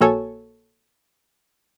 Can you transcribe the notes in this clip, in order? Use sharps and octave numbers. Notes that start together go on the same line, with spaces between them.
A#1 A#3 F#4 A4 C#5 G#5